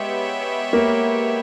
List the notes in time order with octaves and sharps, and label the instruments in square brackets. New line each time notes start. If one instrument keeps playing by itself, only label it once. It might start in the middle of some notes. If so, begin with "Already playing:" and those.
Already playing: [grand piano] G#3 [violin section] B3 G4 C#5 E5
[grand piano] A#3